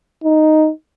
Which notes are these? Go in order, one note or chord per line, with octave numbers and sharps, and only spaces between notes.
D#4